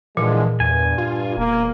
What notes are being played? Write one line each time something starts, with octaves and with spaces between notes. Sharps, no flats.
A#2 D3 E3 F3 G#3
E2 G2 G#5
F4
E1 A#3